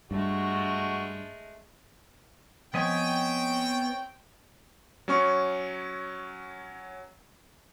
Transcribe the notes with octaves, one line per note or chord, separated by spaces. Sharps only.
G2 G#3 A3 F#4
F3 B3 C4 C#5 D#5 G5 G#5
F#3 C#4 C#6